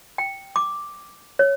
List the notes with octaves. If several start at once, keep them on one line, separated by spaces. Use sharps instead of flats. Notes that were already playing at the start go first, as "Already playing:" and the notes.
G5
D6
C#5